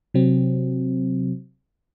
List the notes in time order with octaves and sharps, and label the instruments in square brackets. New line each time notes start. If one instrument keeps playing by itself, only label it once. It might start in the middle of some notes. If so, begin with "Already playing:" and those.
[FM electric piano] C3 F#3 C4